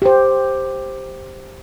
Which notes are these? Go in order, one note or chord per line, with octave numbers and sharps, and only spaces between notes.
G4 C5